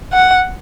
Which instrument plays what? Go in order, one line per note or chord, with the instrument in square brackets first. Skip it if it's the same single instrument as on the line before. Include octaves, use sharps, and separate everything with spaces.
[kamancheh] F#5